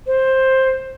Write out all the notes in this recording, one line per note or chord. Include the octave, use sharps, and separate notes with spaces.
C5